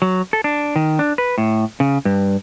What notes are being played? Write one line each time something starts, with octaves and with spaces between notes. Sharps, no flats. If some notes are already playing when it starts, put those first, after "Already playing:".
F#3
A4
D4
D#3
D4
B4
A2
C#3
G2